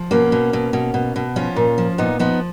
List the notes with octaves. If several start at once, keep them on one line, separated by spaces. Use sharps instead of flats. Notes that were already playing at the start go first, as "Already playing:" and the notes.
Already playing: F3
B2 A#3 C#4
B2
B2
B2
B2
B2
F3 C#4 F4
A#2
F3
A#2 B3 D#4
F3 B3 D#4